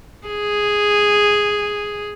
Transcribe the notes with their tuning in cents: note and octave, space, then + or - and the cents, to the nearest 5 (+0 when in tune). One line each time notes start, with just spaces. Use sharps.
G#4 -5